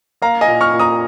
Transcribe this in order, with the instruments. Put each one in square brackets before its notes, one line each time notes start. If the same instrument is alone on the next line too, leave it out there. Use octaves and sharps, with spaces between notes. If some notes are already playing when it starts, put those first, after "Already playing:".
[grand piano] A#3 F5 A#5
D#5 G#5
A#2
C#6 F6
A#2
A#5 D#6